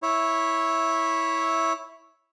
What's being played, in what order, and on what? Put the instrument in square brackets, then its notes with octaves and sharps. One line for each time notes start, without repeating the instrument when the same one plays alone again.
[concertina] E4 C#5 E5